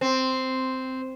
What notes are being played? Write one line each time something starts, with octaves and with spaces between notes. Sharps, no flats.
C4